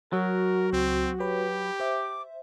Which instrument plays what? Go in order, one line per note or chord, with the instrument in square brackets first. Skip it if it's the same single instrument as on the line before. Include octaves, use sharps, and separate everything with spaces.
[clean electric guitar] F#3 [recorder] F#4 [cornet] A#4
[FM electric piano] C#2 [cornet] C4
[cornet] G4 [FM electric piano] B4 C#5 B5
[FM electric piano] C5 E5 [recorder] D6